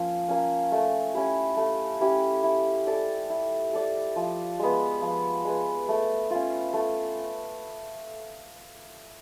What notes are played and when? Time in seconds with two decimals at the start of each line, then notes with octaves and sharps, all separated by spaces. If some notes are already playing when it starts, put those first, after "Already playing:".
Already playing: F3 A#3 C#4
0.28 A#3 C#4
0.72 A3
1.14 C#4 E4 G4
1.57 A3
2.01 C#4 E4 G4
2.43 E4
2.87 A4 D5
3.30 E4
3.73 A4 D5
4.16 F3
4.59 G#3 B3
5.02 F3
5.45 G#3 B3
5.89 A3
6.31 C#4 F4
6.74 A3